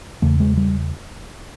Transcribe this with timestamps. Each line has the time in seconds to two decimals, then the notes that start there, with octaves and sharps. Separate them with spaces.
0.22 E2 C#3 A3
0.40 G#3
0.57 G3